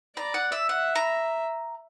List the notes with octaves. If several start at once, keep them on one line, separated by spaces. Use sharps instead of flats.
D5 A#5
F#5
E5
E5 F#5
A#5